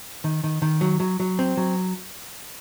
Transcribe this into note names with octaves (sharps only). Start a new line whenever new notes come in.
D#3
D#3
D#3
F#3
F#3
F#3
C4
F#3